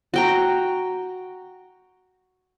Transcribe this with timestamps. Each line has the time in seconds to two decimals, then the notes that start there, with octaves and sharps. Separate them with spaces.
0.14 F#4 G5 A#5